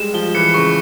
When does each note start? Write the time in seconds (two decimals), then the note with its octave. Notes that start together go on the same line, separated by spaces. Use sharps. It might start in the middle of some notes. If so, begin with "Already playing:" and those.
Already playing: G3 G#3 E7
0.14 F3 G7
0.35 E3 C#7
0.54 C#3 C#6